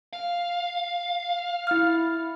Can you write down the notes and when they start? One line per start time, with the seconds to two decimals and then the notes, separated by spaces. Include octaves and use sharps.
0.13 F5
1.67 E4 F6